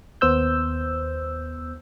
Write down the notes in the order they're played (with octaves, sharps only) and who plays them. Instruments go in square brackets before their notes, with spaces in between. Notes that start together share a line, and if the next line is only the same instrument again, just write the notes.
[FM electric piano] D#2 B3 C5 E6 G6